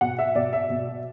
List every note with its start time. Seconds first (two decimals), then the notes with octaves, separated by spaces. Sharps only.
0.01 B2 F#5
0.19 E5
0.35 B2 D5
0.53 E5
0.70 B2